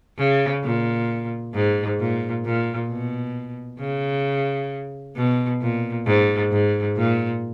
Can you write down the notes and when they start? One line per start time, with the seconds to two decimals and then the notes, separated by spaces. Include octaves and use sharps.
0.18 C#3
0.64 A#2
1.54 G#2
1.99 A#2
2.45 A#2
2.89 B2
3.80 C#3
5.16 B2
5.61 A#2
6.07 G#2
6.52 G#2
6.97 A#2